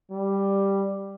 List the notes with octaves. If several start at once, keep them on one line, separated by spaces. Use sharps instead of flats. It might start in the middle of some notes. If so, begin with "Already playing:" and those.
G3